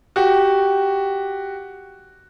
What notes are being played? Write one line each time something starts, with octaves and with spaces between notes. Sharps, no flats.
F#4 G4